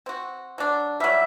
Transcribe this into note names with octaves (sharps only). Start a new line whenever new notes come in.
C4 F#4
F#3 D4
F#3 G3 E5